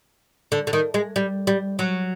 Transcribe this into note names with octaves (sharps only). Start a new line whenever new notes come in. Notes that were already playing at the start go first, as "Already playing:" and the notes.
D3
D3
D#3
G#3
G3
G3
F#3